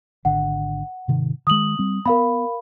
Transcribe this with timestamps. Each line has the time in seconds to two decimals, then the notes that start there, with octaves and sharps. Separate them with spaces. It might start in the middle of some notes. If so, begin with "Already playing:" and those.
0.25 G#1 D3 F#5
1.08 G#2 C3 D#3
1.47 D#3 G#3 D#6 F#7
1.79 G3 C4
2.06 B3 A#4 F5 B5